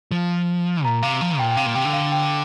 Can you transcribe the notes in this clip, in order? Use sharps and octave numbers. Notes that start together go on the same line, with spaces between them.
F3
A#2 A#5
C3 F5
F3
A#2 G5
G5
C3 F5
A#2
C3 G5
D3
F5
G5